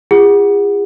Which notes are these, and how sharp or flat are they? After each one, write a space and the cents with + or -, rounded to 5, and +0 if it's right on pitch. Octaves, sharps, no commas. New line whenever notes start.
F4 -35 G#4 -40 F#5 +0